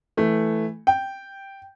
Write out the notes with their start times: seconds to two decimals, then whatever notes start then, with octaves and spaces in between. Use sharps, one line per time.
0.17 E3 A3
0.87 G5